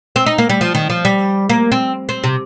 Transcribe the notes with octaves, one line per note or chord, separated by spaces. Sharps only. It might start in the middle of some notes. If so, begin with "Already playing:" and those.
C4
D#4
A#3
G3
F3
D#3
F3
G3
A#3
C4
C4
C3